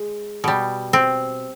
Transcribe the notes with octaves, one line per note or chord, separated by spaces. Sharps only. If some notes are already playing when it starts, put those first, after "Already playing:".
Already playing: G#3
B2 G3
C4